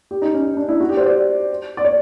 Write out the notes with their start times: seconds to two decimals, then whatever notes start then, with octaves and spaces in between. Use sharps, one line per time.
0.11 G4
0.22 D#4
0.34 C#4
0.45 C#4
0.57 D4
0.69 E4
0.80 F#4
0.90 G4
0.97 C5
1.06 D5
1.77 D5
1.85 C#5